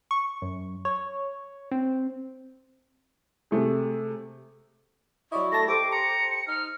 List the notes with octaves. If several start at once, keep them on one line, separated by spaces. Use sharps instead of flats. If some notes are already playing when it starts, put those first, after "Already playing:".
C#6
F#2
C#5
C4
C3 A3 G#4
F#3 E4 D5 D#5 C#6
A3 A5 A#6
G4 A4 C5 C6 D6
A#5 C#7
D#4 F6